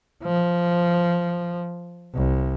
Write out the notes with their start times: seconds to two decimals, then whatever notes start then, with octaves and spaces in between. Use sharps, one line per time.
0.23 F3
2.15 C2